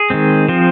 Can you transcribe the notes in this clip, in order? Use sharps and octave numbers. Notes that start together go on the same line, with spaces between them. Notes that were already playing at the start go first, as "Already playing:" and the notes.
Already playing: G#4
D#3 G#3 C4
F3 C4